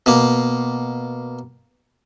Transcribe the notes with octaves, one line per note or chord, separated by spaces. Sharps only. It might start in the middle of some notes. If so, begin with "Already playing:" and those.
B2 A#3